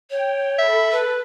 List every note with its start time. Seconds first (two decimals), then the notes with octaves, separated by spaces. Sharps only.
0.10 C#5 G5
0.58 A4 E5 B5
0.92 B4